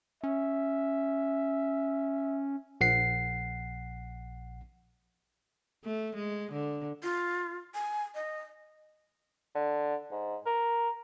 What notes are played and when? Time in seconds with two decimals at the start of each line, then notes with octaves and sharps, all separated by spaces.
0.24 C#4 E5
2.81 A#1 F#5 C7
5.85 A3
6.16 G#3
6.52 D3
7.03 F4
7.75 G#5
8.15 D#5
9.55 D3
10.11 G#2
10.46 A#4